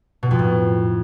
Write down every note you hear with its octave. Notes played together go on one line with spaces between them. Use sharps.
B2
F2
A2